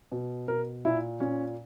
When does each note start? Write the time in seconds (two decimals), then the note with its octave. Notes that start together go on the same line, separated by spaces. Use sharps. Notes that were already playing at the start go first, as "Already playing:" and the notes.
0.12 B2
0.48 B2 A#4
0.85 A#2 E4
1.20 A#2 C#4